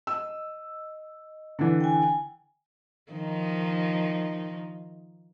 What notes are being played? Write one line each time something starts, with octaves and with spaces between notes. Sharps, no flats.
D#5 E6
D3 E3
G5 G#5
D#3 F3 D#4